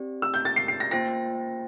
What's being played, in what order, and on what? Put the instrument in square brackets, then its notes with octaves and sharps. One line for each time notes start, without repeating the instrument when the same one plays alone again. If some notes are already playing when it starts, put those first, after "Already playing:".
Already playing: [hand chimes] C4 G4 D5
[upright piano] E6
G6
A6
C7
C7
A#6
[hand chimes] A#3 F4 C5 G5 [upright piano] A#6